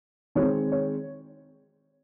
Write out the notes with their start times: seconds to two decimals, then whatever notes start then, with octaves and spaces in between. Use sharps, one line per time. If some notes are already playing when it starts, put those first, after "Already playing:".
0.35 D#3 G#3 C4 C#5
0.72 C#5